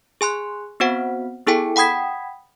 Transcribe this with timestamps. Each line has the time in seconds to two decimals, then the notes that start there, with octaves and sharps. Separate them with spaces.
0.21 G#4 G#5 C6 F#6
0.80 B3 C4 F#4 C5 F#5
1.47 B3 E4 G#4 A4 G5 G#5
1.76 F#5 G5 B5 D#6 G#6 B6